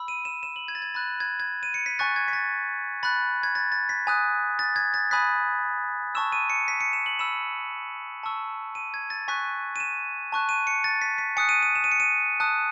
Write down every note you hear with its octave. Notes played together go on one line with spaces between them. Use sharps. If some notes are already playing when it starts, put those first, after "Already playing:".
Already playing: B5 E6
D#7
E7
E7
F#7
G#6
A6
G#6
B5 F#6 A6
G#6
G#6
D#7
C#7
B6
G#5 C#6 F#6 A6
G#6
B6
A6
B5 F#6 A6
G#6
A6
A6
B6
G#5 D#6 F#6
A6
G#6
A6
G#5 B5 D#6 F#6 B6
A5 C#6 E6 E7
D#7
C#7
B6
C#7
E7
F#7
B5 E6 E7
A5 C#6 E6
D#7
G#6
A6
G#5 C#6 F#6 B6
D#7
E7
A5 C#6 F#6
D#7
C#7
A6
B6
B6
G#5 D#6 F#6 C#7
D#7
D#7
E7
D#7
C#7
D#7
A5 D#6 F#6